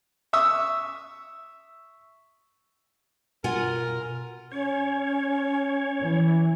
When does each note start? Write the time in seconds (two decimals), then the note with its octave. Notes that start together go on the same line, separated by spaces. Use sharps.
0.33 E5 C#6 D#6 E6
3.44 B2 F4 A#4 F#5 G#5
4.52 C#4 C#5
6.02 E3